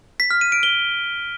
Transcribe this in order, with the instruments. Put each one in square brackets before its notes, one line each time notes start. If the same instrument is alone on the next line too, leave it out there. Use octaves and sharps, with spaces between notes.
[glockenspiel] B6
F6
D#7
D7
G7